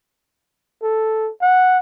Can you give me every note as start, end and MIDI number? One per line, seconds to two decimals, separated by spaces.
0.82 1.31 69
1.42 1.79 78